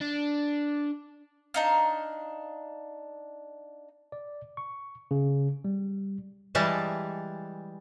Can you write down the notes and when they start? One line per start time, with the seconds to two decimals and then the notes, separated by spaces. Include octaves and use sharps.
0.01 D4
1.54 D4 D#4 F5
4.12 D5
4.57 C#6
5.11 C#3
5.65 G3
6.55 E3 G3 G#3 A5